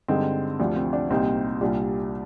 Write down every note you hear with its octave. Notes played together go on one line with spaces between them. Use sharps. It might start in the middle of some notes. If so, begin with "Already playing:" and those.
G2 D3 G#3 C4 D#4
D2 C3 F3 D4
C4
D4
C2 A#2 G3 C4 D#4
C2 A#2 G3 D4 F4